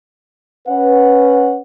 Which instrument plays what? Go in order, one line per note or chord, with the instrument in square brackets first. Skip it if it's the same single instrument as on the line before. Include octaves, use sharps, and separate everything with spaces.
[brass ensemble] C#4 B4 F#5